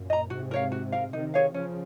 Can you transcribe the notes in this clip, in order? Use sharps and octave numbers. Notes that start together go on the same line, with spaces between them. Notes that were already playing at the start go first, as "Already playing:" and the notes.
Already playing: F#2 A#2
D#5 A#5
G#2 C3 F#4
A#4 C#5 F5
F#4
A#4 F5
C3 D#3 D#4
G#4 C#5 F5
C#3 F3 C#4